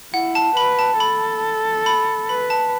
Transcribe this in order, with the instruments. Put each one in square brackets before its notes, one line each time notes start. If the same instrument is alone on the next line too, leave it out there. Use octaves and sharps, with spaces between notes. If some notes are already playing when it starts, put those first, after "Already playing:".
[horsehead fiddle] E4 [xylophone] F#5
[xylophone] A5
[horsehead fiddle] B4 [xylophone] B5
[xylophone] A5
[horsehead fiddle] A4 [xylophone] B5
[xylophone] B5
[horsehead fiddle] B4 [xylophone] B5
[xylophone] A5